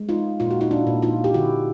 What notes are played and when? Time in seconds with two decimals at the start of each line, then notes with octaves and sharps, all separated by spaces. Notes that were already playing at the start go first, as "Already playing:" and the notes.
Already playing: G#3
0.09 D#4 F4
0.40 A#2 F4
0.51 F#4
0.61 D#4 F4
0.71 D4 E4
0.87 A#2
1.02 D#4 F4
1.24 G4
1.34 D3 E4 F#4